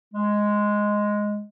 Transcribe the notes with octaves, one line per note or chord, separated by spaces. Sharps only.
G#3